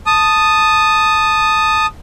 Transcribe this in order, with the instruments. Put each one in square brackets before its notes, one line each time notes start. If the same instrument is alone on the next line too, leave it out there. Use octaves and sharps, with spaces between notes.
[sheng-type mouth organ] A5 D#6